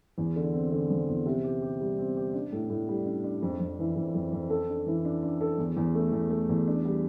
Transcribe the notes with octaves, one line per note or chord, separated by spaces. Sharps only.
E2
D3
C4
D3
F3
E2
C3
G4
G4
G3
C4
G4
D4
A2
A2
G3
D4
D4
F2
F2
E3
F2
F2
F2
A4
D4
E3
D4
D4
A4
E2
E2
A3
E2
A3
E2
D4
G3